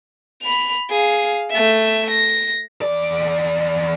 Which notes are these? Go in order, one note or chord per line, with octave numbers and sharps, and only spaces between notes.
B5 F7
G#4 F5
A3 E5
A#6
E2 D5